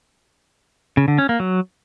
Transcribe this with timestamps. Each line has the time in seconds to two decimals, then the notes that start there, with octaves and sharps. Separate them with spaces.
0.97 C#3
1.08 D3
1.18 C#4
1.29 A#3
1.40 F#3